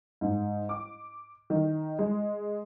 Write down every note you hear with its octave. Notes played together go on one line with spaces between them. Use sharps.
G#2
D6
D#3
G#3